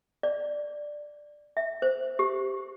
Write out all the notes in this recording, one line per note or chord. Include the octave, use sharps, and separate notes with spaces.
D5
E5
C5
G4